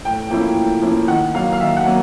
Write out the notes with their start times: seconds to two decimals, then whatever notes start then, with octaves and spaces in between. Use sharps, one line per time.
0.05 A2 G5
0.30 F3 A#3 C#4 E4
0.56 A2
0.82 F3 A#3 C#4 E4
1.08 D#3 F#5
1.35 F#3 A#3 F5
1.53 F5
1.60 D#3 E5
1.77 F#5
1.86 F#3 A#3